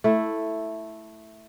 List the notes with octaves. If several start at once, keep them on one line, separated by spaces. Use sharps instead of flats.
A3 E4